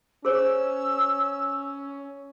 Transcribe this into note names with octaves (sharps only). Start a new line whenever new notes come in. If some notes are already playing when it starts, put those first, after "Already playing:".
C#4 G#4 C5 E6